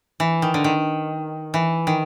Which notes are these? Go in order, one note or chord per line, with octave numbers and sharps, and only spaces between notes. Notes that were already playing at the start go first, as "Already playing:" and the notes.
E3
D#3
D3
D#3
E3
D#3